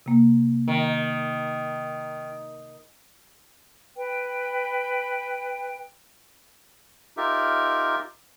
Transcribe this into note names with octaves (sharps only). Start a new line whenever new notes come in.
C3 A#3
D#3
B4 G5
D#4 F4 G4 A#4 E5